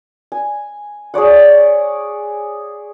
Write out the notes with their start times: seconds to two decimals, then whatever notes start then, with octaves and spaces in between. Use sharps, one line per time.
0.32 G#5
1.14 G#4 C#5 D5 F#5